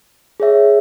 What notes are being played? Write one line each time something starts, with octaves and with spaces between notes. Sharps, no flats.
G#4 C#5 E5